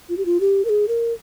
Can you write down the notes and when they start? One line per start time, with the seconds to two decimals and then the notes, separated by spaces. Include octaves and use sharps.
0.09 F4
0.17 G4
0.25 F4
0.40 G4
0.65 A#4
0.69 G#4
0.88 A#4